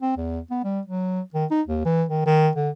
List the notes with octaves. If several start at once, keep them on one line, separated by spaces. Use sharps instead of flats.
C4
E2
B3
G3
F#3
D#3
D#4
D#2
E3
D#3
D#3
D3